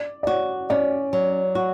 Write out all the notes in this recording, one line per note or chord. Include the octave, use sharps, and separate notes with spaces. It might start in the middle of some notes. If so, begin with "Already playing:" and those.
Already playing: D5
D5
F#4 C#5
C#4 D5
F#3
F#4